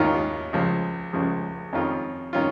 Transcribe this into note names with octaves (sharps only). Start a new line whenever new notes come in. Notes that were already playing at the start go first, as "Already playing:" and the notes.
Already playing: D#2 D#3 C#4 F4
C#2 C#3 F3
C#2 C#3 F3
F2 D#3 C#4 F4
D#3 C#4 F4